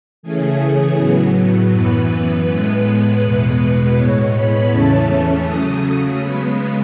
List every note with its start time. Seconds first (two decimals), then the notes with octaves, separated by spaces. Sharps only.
0.23 C#3 E3 A3 C#4 G#4
0.60 G#4
0.97 A2 F#3 B3
1.72 F#2 E3 B3 B4
2.46 A2 G#3 B3
3.21 E2 B2 G#3 B3
3.96 A2 G#3 B3 C#5
4.33 B5
4.70 E2 C#3 E3 A3 C#4 A5
5.45 C#3 F#3 A3 D#6
5.83 D#6
6.19 C#3 G#3 B3 B5